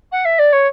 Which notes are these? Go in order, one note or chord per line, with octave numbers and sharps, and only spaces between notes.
F#5
E5
D5
C#5